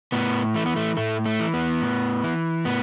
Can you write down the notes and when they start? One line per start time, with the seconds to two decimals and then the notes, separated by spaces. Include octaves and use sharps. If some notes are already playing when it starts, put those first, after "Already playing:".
0.12 A2 B3
0.55 E3 A3
0.66 B3
0.76 A3
0.97 A2 A3
1.26 A3
1.40 E3
1.54 B3
1.81 A2
2.24 E3
2.65 A2 B3